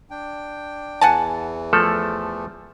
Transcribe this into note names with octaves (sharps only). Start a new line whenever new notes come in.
D4 G5
E2 E3 F#5 G#5 A5
F3 A3 A4